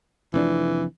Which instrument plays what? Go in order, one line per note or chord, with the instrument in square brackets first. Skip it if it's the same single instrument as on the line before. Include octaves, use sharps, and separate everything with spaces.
[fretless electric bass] F1 F2 D4 [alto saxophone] E3